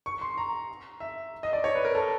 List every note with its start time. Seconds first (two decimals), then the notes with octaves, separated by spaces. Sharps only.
0.06 C#6
0.21 C6
0.38 A#5
1.00 E5
1.43 D#5
1.53 D5
1.64 C#5
1.75 B4
1.85 A#4
1.95 A4